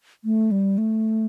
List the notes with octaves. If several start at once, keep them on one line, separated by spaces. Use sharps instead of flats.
A3
G3
A3